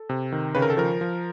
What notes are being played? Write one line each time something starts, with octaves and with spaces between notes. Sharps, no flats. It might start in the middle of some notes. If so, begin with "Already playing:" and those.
Already playing: A4
C3
D#3
C#3 B4
A#4
A4
F3 A#4
F3